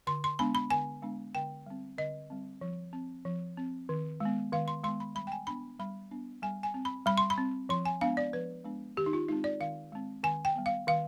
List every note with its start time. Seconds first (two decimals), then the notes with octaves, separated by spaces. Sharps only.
0.07 D3 C6
0.24 C6
0.39 G#3 B3 D4 B5
0.55 B5
0.70 D3 G#5
1.02 G#3 B3 D4
1.35 D3 G5
1.66 G3 C4
1.98 D3 D#5
2.30 G3 C4
2.61 F3
2.93 C4
3.25 F3
3.57 C4
3.89 D#3
4.20 G#3 B3
4.53 D#3 F5
4.68 C6
4.84 G#3 B3 C6
5.00 B5
5.15 G3 B5
5.27 G5
5.32 G#5
5.47 B3 D4 B5
5.79 G3 B5
6.11 B3 D4
6.42 G3 G#5
6.63 G#5
6.74 C4
6.85 B5
7.06 G3 B5
7.18 C6
7.30 B5
7.38 C4
7.69 F3 C6
7.85 G#5
8.01 G#3 B3 D4 F5
8.17 D5
8.33 F3 B4
8.65 G#3 B3 D4
8.97 D#3 G4
9.06 D#4
9.13 F4
9.29 G#3 C4 D#4
9.44 D5
9.60 D#3 F5
9.92 G#3 C4
10.23 D#3 G#5
10.45 G5
10.55 G3 B3
10.66 F5
10.87 D#3 F5